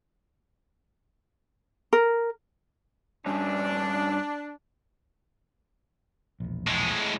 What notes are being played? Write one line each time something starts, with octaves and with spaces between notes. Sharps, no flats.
A#4
G2 C#4 D4
E1 A#1
A2 G#3